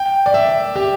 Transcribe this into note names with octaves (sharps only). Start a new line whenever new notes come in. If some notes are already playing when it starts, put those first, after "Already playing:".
Already playing: G5
D5
E5
G4